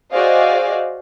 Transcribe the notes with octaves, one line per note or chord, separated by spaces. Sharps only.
F#4 G#4 C5 D5 D#5 F5